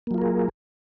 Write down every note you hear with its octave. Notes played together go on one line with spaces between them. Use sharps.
F#3 A#3 F4 G#4 A#4